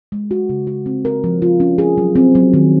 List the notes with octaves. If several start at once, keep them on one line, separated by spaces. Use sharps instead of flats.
G#3
F#4
C#3
F#4
C4
A#4
F3
F4
C#4
G#4
F#3
C4
F#3
D#3